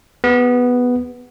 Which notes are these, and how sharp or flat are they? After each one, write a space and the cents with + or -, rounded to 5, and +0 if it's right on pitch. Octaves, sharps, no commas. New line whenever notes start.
B3 +0 G4 +45